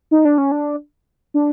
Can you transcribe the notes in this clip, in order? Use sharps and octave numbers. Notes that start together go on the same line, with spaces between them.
D#4
D4
C#4
D4
D4